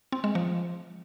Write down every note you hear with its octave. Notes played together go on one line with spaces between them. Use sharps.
C4
G#3
F3